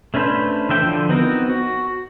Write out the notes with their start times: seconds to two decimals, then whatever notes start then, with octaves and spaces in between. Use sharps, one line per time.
0.14 A3 C#4 D4 B4 C5
0.69 D3 E3 E5 G5
0.83 D3 F3
1.09 B3 C4 D#4 F#4 A#4
1.50 F#4